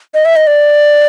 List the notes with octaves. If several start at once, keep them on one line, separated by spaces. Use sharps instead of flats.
D#5
E5
D#5
D5